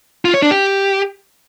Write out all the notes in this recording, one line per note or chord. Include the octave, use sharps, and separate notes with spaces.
F4
C#5
D4
G4